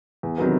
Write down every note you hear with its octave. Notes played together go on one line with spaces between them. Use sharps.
E2
C3 D#3 F#3 B3